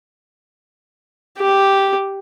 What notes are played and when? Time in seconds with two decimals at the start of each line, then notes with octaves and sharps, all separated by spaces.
1.39 G4